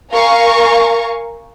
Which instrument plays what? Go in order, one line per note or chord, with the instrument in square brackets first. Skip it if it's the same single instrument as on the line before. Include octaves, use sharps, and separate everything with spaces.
[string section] A#4 F5 G#5 A#5 C#6